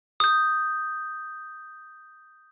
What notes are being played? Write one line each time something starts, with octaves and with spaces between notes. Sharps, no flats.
D#6 G6